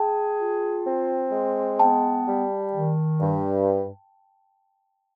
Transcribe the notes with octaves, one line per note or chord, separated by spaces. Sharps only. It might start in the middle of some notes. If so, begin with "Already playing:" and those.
Already playing: G#4 G5 A5
F4
C4
G#3
B3 G5 A5
G3
D#3
G2